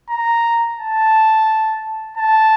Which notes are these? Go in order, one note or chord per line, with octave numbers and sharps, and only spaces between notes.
A#5
A5
A5